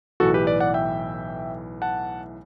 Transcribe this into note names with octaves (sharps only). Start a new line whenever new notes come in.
B1 A2 E3 F#4 A4
G4 B4
B4 D5
D5 F#5
E5 G5
F#5 A5